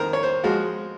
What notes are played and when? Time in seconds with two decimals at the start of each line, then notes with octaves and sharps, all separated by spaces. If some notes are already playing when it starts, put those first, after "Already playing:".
Already playing: F2 D#3 A#4 C5
0.13 C#5
0.23 C5
0.44 F3 G#3 F#4